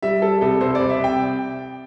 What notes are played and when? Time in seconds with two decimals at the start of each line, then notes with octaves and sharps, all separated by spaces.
0.03 G3 E5
0.22 G3 A4
0.41 C2 A4
0.61 C2 C5
0.75 D5
0.80 C2
0.90 E5
1.00 C2 G5